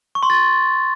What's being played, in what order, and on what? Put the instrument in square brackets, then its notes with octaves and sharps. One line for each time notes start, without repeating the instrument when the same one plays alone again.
[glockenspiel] C#6
C6
A6